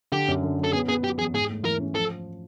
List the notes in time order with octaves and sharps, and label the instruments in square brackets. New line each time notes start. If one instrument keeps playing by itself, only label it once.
[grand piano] D3 [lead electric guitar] G4
[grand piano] F#2
D3
F#3
[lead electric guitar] A4
[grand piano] B3 [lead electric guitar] G#4
[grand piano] B3 [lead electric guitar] G#4
[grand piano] F#3 [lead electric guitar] G4
[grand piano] E2 [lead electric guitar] G#4
[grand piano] G#2 [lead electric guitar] G#4
[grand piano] A3
[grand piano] E3 [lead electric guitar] A#4
[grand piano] C#4
[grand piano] F3 [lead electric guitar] A4